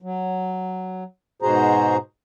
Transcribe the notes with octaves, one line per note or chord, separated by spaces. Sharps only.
F#3
G#2 B2 F#4 G#4 C5 A#5